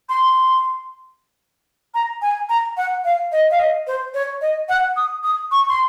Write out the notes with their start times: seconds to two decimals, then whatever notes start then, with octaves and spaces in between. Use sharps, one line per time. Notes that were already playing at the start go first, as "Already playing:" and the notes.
0.09 C6
1.95 A#5
2.22 G#5
2.49 A#5
2.77 F#5
3.05 F5
3.32 D#5
3.51 F5
3.59 D#5
3.87 C5
4.14 C#5
4.41 D#5
4.69 F#5
4.97 D#6
5.23 D#6
5.52 C#6
5.69 C6